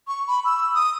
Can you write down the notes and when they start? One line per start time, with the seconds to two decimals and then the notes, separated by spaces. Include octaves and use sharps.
0.08 C#6
0.28 B5
0.45 E6
0.75 D#6